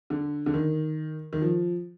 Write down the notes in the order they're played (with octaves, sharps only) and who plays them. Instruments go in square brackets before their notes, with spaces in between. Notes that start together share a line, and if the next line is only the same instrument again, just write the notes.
[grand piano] D3
D3
D#3
D#3
F3